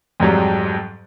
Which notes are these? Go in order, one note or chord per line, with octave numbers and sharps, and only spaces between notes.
F2 G#2 F#3 G3